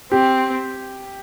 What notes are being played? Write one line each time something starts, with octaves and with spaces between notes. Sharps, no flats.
C4 G4